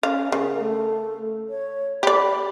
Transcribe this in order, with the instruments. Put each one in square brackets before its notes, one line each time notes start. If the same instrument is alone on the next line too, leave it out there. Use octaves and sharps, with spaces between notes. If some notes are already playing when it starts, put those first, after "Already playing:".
[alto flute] C#4 [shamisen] F5
[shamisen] C#3 [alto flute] A#4
[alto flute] A3
C#5
[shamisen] G4 D5 [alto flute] B5